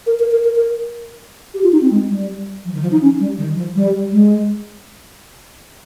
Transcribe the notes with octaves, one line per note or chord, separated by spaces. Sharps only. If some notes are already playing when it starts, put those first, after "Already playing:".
A#4
A#4
A#4
A#4
A#4
G4
F4
D#4
C4
G#3
G3
F3
D#3
F3
D#4
C#4
G3
D#3
F3
G3
G#3